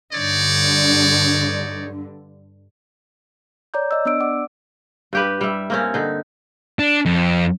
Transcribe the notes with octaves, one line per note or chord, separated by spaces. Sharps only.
G2 D3 D#4 C#5 D5
C#5 D5 A#5 D6 G6
D5 D#5 E6
B3 D4 D5 E6 D7
D5 F#5 D6
G2 G4 B4
G3 E5
A#3 C4 C#4
D3 D#4
D4
F2